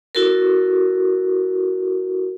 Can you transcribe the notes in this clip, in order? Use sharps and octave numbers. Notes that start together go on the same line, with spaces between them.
E4 F#4 A4 A#4